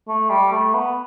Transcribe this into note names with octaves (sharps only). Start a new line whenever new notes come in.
A3
G3
A3
B3